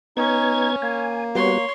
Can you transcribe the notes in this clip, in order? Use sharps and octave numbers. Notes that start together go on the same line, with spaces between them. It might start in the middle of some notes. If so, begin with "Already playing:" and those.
B3 C#4 D#4 G#6
A#3 G#5
G3 B3 F#4 C#5 C6